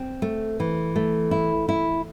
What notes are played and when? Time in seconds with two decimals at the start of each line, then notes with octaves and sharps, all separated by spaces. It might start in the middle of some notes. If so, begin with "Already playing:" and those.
Already playing: C4
0.22 A3
0.60 E3
0.96 A3
1.31 E4
1.69 E4